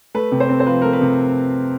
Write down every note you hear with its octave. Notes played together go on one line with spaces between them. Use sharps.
A3 B4
C3
C5
C4
C5
F3 B4
A3 A#4
B4
C3